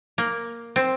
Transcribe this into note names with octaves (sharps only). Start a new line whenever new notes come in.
A#3
C4